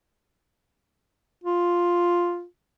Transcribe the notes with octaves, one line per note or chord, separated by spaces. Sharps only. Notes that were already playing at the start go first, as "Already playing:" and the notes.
F4